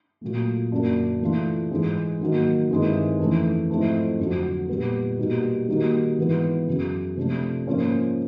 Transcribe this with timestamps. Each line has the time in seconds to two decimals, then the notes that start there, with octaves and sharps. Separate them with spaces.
0.21 A#2 F#3 A3
0.72 F#2 D3 F#3 A#3 D4
1.21 E3 A3 D4 F4
1.71 G#2 E3 G#3
2.21 G#2 D#3 F#3 A#3
2.70 G2 D#3 G#3 C4 E4
3.20 F2 C#3 E3 A3
3.70 G#2 F3 A3 C4 E4
4.19 F2 D3 F#3
4.69 A#2 G3 B3
5.18 B2 G3 A#3 D#4 F#4
5.68 D#3 G3 A#3 D#4 F#4
6.18 G#2 E3 G#3 B3
6.67 F#2 C#3 F#3
7.17 C3 F3 A3 D4
7.66 G#2 F3 A#3 C#4